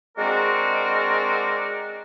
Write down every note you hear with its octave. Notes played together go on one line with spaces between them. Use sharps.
G#3 C4 D4 F#4 A#4